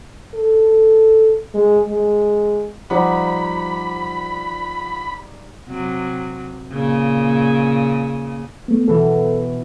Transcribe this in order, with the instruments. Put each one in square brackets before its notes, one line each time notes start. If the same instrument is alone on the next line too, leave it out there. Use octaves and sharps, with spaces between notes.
[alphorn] A4
G#3
G#3
[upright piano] F3 F#5 [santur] G3 D#4 [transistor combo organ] B5
[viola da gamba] C3 F#3
A#2 C#3
[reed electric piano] A3 B3
[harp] B2 E3 [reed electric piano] A4